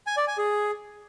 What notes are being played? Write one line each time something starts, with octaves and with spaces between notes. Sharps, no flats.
G#5
D5
G#5
G#4